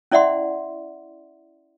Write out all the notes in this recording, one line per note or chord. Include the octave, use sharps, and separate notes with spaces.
C#4 E4 D5 E5 F#5 C6